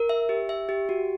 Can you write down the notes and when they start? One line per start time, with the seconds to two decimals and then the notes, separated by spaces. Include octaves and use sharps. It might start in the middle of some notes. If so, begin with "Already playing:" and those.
Already playing: A#4
0.09 E5
0.29 G4
0.49 E5
0.69 G4
0.89 F#4